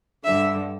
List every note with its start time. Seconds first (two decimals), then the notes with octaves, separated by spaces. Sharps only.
0.24 G2 D3 E5